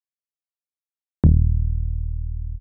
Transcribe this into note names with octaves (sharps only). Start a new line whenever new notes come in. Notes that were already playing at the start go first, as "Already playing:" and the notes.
D#1